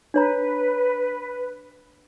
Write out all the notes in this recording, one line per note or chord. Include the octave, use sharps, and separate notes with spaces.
D4 B4 C#5 A#5